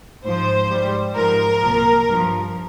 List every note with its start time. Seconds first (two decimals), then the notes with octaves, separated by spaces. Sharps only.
0.24 G#2 F3 C5
0.70 G#2 G3
1.16 G#2 F3 A#4
1.62 C2 A#2 F3
2.07 G2 F3